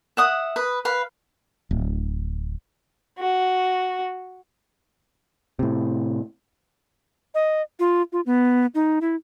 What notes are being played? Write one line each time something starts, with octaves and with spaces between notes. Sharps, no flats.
E5 F#5 D#6
B4 D#6
B4 F5
D1
F#4
A2 C3
D#5
F4
F4
B3
D#4
E4